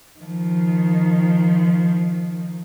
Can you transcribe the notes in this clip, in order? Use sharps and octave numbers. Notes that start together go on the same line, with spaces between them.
D#3 F3